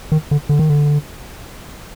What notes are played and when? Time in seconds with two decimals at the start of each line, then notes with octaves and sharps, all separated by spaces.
0.12 D#3
0.31 D3
0.49 D3
0.59 D#3
0.70 D3